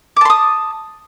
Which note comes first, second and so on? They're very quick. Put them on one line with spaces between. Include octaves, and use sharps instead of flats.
D6 A5 C6 D#6